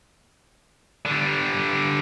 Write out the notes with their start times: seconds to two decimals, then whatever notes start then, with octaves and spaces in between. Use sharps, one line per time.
1.06 D3 G3